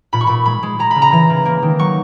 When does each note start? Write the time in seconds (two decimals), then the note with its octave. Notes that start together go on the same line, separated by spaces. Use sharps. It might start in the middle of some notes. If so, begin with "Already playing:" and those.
0.13 A#2 B5
0.21 C#6
0.27 A#2 B5
0.46 G#3 B5
0.63 G#3
0.79 G#3 A#5
0.91 C#3 B5
1.02 A#5
1.12 E3 A#5
1.30 C#3
1.45 A#3
1.62 D#3
1.79 F#3 C#6